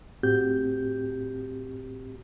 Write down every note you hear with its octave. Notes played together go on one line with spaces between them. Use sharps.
A2 C4 F#4 G4 G6